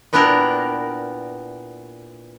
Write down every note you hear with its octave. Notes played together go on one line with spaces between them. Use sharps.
A#2 B3 D4 E4 G4 A#4